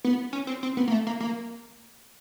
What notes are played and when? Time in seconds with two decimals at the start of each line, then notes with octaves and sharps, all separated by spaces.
0.04 B3
0.33 C#4
0.47 C4
0.63 C4
0.77 B3
0.88 A#3
0.92 A3
1.07 A#3
1.20 A#3